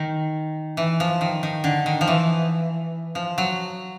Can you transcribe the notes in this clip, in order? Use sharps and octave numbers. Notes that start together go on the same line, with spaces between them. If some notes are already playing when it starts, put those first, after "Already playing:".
Already playing: D#3
E3
F3
D#3
D#3
D3
D#3
F3
E3
F3
F#3